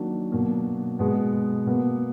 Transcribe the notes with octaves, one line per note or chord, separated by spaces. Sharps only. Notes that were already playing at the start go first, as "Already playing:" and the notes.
Already playing: D#3 F#3 A#3 D4
B2 F#3 A#3
B2 G#3 B3
B2 A#3 B3